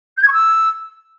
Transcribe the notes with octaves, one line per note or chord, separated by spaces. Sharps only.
G6
G#6
C#6
E6